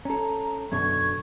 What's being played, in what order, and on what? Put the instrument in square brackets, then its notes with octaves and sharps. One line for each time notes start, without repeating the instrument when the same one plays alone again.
[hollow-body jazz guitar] C#4 A4 [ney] A#5
[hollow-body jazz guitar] F#2 B2 D3 [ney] C#6 [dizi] G#6